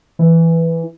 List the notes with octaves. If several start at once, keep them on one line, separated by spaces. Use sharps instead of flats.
E3